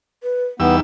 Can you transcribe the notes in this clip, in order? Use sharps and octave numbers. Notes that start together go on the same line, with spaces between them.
B4
E2 G3 B3 D#4 E6